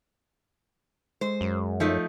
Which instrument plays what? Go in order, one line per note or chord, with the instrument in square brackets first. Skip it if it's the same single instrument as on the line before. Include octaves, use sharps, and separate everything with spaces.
[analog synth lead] G#3 [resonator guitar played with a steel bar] C5
[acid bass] F#2
[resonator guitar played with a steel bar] F3 A3 D#4